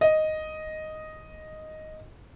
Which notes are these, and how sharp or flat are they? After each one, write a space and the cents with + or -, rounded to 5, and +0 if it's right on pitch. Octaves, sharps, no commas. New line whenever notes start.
D#5 +0